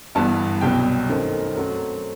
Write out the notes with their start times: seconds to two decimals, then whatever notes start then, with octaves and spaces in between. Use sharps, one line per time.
0.15 G1 G2 E3 G3 B3 A5
0.61 C2 B2 F#3 B3 G5
1.09 F#2 D#3 A3 C4
1.55 F#2 F#3 A3 C4